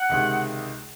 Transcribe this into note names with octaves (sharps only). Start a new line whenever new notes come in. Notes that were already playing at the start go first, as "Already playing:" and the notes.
Already playing: F#5
C#2 C3 D#3 G#3